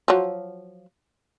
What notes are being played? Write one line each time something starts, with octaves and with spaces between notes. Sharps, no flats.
F3 F#3